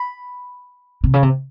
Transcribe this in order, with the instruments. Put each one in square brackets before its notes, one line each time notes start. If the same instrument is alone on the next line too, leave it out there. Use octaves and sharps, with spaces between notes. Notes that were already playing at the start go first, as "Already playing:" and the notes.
Already playing: [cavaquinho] B5
[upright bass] C3
C#3
C3